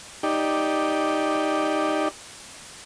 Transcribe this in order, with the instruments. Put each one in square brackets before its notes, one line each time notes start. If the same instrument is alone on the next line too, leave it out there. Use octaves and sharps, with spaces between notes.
[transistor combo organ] D#4 G4 D5